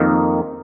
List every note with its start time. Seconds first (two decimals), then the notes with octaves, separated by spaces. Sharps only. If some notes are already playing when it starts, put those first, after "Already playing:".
Already playing: F2 D#3 A#3 D#4 A#4